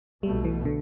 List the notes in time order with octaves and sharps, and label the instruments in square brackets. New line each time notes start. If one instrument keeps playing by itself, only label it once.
[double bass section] B1 B2 A3 [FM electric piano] G3
[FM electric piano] E3
D3